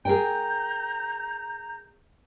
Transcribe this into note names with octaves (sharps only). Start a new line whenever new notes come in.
G#4 A#4 G5 A#5 G6